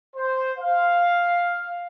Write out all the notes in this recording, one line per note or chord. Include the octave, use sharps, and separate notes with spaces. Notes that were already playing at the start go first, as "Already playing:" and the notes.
C5
F5